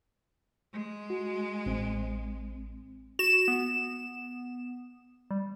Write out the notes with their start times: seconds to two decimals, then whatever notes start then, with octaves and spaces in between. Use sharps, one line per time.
0.73 G#3
1.10 F#4
1.66 A1 C4
3.19 F#4 E7
3.48 B3
5.31 G3